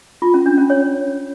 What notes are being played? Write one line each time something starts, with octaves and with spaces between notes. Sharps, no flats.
F4
C#4
D4
C#4
C#5